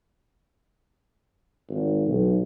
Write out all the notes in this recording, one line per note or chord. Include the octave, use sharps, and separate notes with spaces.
G#1
B1